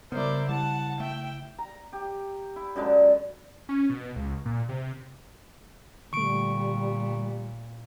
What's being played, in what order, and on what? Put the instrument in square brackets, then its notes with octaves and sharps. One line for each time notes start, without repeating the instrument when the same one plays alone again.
[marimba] C#3 [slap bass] G3 B3 [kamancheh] E4 A#4 [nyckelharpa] C5 D5
[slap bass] G3 [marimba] E4 [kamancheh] F#5 [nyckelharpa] A5
[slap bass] A3 [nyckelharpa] E5 [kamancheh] G5
[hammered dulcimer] A#5
G4
E4
F#2 D3 G#3
[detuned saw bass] C#4
B2
C#2
A#2
C3
[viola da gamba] A#2 [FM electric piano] D3 A3 [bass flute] G3 [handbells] C#6 D7